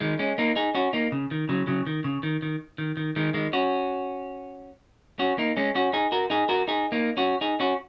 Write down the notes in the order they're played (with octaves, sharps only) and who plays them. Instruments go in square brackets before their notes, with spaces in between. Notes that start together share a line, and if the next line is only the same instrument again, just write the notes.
[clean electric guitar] D#3 G#3
G#3 C#4
A#3 D#4
D#4 G#4
C#4 F#4
A#3 D#4
C#3
D#3
C#3 F#3
C#3 F#3
D#3
C#3
D#3
D#3
D#3
D#3
D#3 G#3
D#3 G#3
C#4 F#4
C#4 F#4
A#3 D#4
G#3 C#4
C#4 F#4
D#4 G#4
F#4 A#4
D#4 G#4
F#4 A#4
D#4 G#4
A#3 D#4
C#4 F#4
D#4 G#4
C#4 F#4